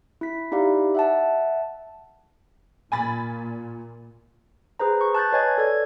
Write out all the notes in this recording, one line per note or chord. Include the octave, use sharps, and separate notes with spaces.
E4 B6
D#4 E4 G4 D5 F5
E5 F#5 A5
A#2 G#5 B5 A6
G#4 B4 C5 A#5
C#6
A5 F#6 G6 A6
B4 C#5 D#5 G#5 G#6
A4 D5 G#6